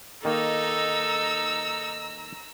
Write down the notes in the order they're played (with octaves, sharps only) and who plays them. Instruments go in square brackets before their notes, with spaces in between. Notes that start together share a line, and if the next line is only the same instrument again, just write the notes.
[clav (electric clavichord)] D#3 A#3 [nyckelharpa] D#4 [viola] A4 [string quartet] A#5 E6